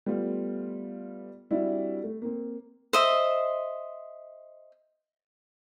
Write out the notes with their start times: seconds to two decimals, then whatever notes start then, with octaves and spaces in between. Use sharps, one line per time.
0.06 G3 A3 B3 F4
1.51 G3 C4 D4 E4 F#4 G4
2.04 A3
2.22 A#3 C4
2.93 C5 D#5 E5